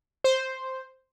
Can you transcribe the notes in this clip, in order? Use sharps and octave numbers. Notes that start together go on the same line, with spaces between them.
C5